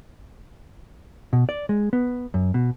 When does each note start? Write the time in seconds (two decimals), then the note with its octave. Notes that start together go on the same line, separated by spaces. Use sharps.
1.33 B2
1.49 D5
1.69 G#3
1.93 B3
2.34 F#2
2.54 B2